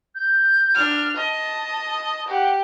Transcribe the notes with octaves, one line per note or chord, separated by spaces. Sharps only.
G6
D4 F6
D#5 A5
G4 F#5